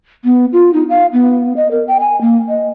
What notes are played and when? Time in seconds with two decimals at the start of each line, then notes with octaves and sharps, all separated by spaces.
0.25 B3
0.53 F4
0.73 D#4
0.89 F5
1.13 B3
1.57 D#5
1.71 A#4
1.88 G5
2.00 G#5
2.21 A#3
2.49 D#5